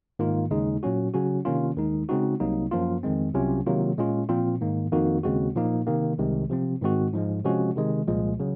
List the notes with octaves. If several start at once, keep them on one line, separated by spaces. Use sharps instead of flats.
G#2 D#3 A#3 F4
D#2 C#3 G#3 D#4
A#2 F#3 C#4 F#4
C#3 F#3 C#4 F#4
C3 D#3 A#3 C#4 F4
D#2 D#3 G#3 D#4
C#3 G#3 C4 D#4 F#4
C2 C3 F#3 A#3 D#4
F#2 F3 A#3 F4
F2 D#3 G#3 C4
C2 C3 F#3 C#4 F4
C3 D#3 F#3 A#3 F4
A#2 G#3 C#4 F4
A#2 F3 C4 F4
G#2 D#3 A#3
F2 D#3 A#3 D#4 F#4
D#2 C#3 G#3 C4 F#4
A#2 F3 A#3 D#4
C3 D#3 A#3
C2 C3 D#3 G#3
C3 F3 C4
G#2 D#3 G#3 C4 F#4
G#2 F3 G#3
C3 F3 G#3 C#4 F#4
C3 D#3 G#3
C2 A#2 F3 G#3
C#3 F#3